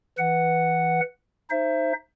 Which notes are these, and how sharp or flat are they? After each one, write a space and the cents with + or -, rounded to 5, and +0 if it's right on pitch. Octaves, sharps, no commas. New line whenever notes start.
E3 +0 B4 +0 F#5 +0
D#4 +0 C5 +10 E5 +25